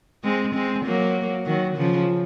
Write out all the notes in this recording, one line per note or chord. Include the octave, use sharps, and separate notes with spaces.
G#3 C4
G#3 C4
F#3 A#3
D#3 F#3
C#3 F3